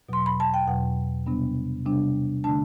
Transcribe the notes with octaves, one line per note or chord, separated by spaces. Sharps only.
E2 B2 F#3 C6
B5
A5
G5
E2 B2 F#3 F#5
C3 G3 B3 D4
C3 G3 B3 D4
D3 A3 D4 A5